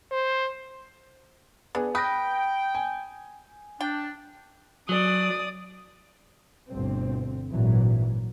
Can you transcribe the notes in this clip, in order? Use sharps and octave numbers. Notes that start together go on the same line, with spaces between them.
C5
B3 D4 G#4
B4 G5 D#6 A#6
G#5
D4 G5
F#3 D5 D#6
G1 D2 B2 C4
G#1 G2 A#2 E3 F#3